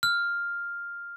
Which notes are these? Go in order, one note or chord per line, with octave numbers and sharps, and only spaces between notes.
F6